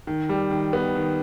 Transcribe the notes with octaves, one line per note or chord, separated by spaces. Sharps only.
D#3
G3
D#3
B3
D#3